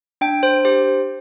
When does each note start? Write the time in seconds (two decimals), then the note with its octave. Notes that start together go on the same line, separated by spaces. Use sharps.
0.21 D4 G5
0.43 D4 C5
0.65 G4 C5